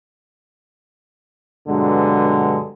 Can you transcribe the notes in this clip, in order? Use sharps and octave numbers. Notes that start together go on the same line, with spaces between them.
G2 B2 D3 F#3 G#3